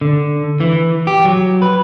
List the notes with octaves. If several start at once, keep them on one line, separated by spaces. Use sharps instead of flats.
D3
E3
G4
F#3
B4